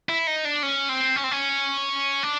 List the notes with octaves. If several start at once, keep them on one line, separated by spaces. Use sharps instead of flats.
E4
D#4
D4
C#4
C4
C#4
C4
C#4
D4